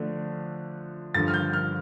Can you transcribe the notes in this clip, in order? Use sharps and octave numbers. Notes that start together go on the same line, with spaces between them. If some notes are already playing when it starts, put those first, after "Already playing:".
Already playing: D3 F3 A3 D4
G2 D3 F3 A6
F6
G6
F6